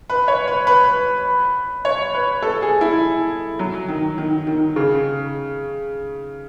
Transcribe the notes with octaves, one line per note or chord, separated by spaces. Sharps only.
B4
C#5
B4
B4
C#5
B4
A4
G#4
E4
F#3
D#3
D#3
D#3
C#3